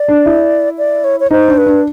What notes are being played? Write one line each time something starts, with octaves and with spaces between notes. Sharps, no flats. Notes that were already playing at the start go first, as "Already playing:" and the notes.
Already playing: D5
D4
E4
D5
C#5
C#5
D#4 C5
D4
B4
D4